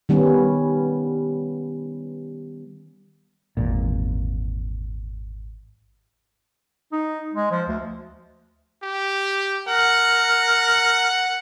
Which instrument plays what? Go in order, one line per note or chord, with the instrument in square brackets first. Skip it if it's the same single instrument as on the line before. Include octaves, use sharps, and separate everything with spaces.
[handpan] D#3 G3 B3 C#4
[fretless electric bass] G#1 E2 A#2
[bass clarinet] D#4
G#3
F3
D2
[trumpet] G4
[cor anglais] A#4 [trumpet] F#5